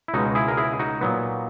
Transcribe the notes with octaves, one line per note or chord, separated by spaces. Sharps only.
E4
C#2 B2 G#3 D#4 F#4
E4 G#4
A#4
E4 G#4
D#4 F#4
A#2 F#3 B3